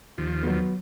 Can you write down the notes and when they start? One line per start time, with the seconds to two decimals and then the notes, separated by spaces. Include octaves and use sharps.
0.18 D#2 F3
0.43 F#3 B3